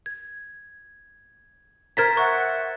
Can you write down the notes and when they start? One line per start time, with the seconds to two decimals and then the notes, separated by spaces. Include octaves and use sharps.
0.06 G#6
1.97 A#4 C5 A#5 G#6 A6 B6
2.17 E5 F#5 C#6